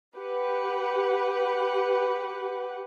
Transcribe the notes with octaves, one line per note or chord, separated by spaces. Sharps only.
G4 B4 F#5